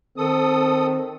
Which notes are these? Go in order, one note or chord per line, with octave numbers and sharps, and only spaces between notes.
D#3 C4 A4 D#6